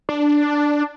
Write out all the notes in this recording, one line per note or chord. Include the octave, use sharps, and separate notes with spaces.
D4